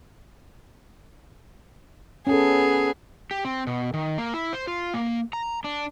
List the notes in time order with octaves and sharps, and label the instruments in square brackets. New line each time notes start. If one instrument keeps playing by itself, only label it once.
[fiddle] B3 G#4 [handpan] C#4 A4
[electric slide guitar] G4
C4
B2
D#3
A#3
E4
C5
F4
A#3
A#5
D4